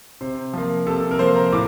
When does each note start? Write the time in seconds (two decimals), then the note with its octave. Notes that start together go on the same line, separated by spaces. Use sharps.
0.21 C3 C5
0.53 F3 A#3
0.87 C3 A4
1.11 A#4
1.19 F3 A#3 C5
1.36 A#5
1.52 A2 D6